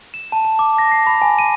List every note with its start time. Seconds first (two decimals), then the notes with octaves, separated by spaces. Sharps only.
0.14 E7
0.32 A5
0.45 A5
0.59 D6
0.78 A#6
0.92 C7
1.07 B5
1.22 G#5
1.39 D#7